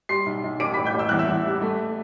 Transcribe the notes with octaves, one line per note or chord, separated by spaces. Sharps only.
G3 C6 C7
B1
B1
A1 D6 D7
A1 B5 B6
G5 G6
A1 E6
E2 F#6
E5 E6
E2
G3
A3